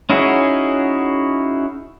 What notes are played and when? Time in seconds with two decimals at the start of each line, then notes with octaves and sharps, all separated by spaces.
0.10 C#4 D#4 E4 F#4 G#4